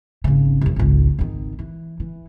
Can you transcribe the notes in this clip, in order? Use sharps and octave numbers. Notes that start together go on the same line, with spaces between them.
G#1 C#3
C2 F2
G#1 C#2
G#1 D#3
E3
E3